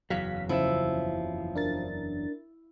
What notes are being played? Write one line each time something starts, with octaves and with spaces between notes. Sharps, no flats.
F#1 E2 F#3 F5 B6
C#3 F3 E4 E5
D4 A#4 A6